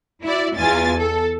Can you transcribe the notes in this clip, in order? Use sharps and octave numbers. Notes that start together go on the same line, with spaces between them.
E4 F#4 D5
E2 F4 G#5 A6
A4